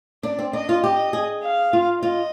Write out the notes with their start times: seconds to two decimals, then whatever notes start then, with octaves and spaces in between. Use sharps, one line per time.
0.23 D4 D5
0.39 C4
0.53 D4 D#5
0.69 F4
0.83 G4 D#5
1.13 G#4
1.43 F5
1.73 F4
2.03 F4 D#5